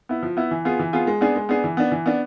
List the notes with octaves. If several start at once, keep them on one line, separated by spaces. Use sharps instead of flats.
B3 E4
F3
B3 E4
E3
B3 F4 G#4
E3
B3 F4 G#4
G#3
B3 D4 G#4
G#3
B3 D4 G#4
E3
B3 D4
E3
B3 D4